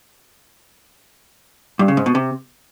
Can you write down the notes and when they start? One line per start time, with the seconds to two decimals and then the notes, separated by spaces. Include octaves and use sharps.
1.79 G2
1.88 C#3
1.97 G#2
2.06 B2
2.15 C3